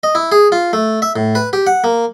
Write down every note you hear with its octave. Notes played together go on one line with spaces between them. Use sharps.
D#5
E4
G#4
F4
A3
E5
A2
B4
G4
F#5
A#3